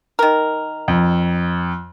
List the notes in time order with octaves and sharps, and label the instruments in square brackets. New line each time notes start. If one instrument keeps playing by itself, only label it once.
[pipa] D#3 A#4
[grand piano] F2